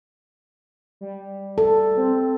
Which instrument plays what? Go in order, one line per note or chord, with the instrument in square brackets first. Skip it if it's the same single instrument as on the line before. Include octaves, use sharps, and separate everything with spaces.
[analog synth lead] G3
[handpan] A4
[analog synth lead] C4